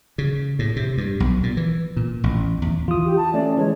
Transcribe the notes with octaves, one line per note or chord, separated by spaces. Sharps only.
C#3
A2
C3
G2
B1
A#2
E3
A#2
A1
E2
E3 F4 D#6
G4
A5
A3 C#4 D5
E3 G#3 C#5